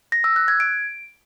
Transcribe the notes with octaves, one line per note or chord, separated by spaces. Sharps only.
A#6
E6
F#6
G#6
D7